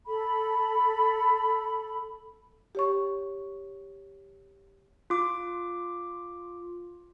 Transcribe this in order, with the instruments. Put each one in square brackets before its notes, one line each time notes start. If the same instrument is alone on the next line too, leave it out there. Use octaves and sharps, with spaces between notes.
[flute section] A4 B5
[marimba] G4 C#5 C#6
[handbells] F4 D6